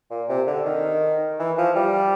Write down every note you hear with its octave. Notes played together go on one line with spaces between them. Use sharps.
A#2
C3
D3
D#3
E3
F3
G3